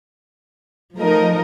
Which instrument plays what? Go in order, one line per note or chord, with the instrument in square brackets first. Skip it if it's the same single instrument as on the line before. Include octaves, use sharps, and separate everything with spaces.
[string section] F3 A3 D#4 A#4 D#5